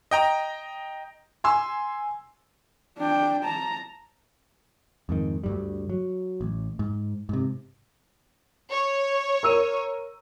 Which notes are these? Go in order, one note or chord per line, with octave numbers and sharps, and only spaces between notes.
D#5 G5 A#5
G#5 C6 E6
D4 G5
A5 A#5
F2 G#2 D#3
D2 G2 G3
F#3
A1
G#2
G#2 C3
C#5
A#4 E6 D#7